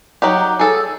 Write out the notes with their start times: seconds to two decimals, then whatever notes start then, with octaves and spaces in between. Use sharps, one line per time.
0.22 F#3 D#4 G4
0.59 G#4 A4